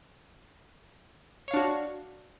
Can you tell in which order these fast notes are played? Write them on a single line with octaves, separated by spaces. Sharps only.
C#5 F5 D4 F#4